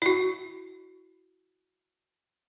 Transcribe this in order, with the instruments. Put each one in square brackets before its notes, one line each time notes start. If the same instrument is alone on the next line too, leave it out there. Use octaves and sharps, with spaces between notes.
[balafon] E4 F#4